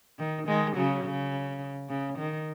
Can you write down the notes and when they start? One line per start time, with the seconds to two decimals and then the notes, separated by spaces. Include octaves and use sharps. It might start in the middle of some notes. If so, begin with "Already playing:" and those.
0.19 D#3
0.47 D#3 G#3
0.76 C#3 F#3
1.05 C#3
1.89 C#3
2.19 D#3